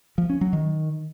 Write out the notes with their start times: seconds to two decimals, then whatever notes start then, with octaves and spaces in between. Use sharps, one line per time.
0.18 F3
0.30 C#4
0.41 F#3
0.53 D#3